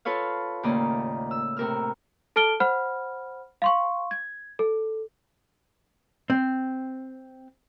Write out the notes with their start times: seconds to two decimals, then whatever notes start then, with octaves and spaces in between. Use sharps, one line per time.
0.05 F4 A4 B4 C#5 F5
0.63 D#2 A2 C#3 A#3 D5 D#5
1.31 E6
1.57 A2 C3 A#4 E6 F6
2.36 A4 A5 F6 D7 G7
2.60 C5 F#5 B5 F6
3.62 F5 C6 C#6
4.11 G#6
4.59 A4
6.30 C4